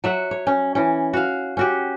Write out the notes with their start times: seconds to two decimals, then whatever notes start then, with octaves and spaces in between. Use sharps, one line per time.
0.04 F#3 E5 F#5
0.31 C#5
0.47 C#4
0.75 E3 C#4
1.13 F#4 F5
1.57 C#4 F#4 G4